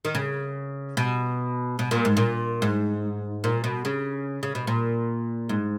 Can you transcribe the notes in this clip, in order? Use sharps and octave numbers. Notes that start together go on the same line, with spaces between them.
D#3
C#3
B2
B2
A#2
G#2
A#2
G#2
A#2
B2
C#3
C#3
B2
A#2
G#2